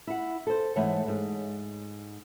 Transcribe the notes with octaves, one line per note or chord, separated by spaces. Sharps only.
E4 F#5
A4 C5
G#2 E3 A3 A4 C#5 F#5
G#2